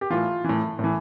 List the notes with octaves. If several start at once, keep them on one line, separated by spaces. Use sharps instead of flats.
G4
A2 E3 F4
A2 E3
A2 E3